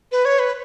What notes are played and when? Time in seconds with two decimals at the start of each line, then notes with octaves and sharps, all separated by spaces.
0.12 B4
0.25 C#5
0.39 B4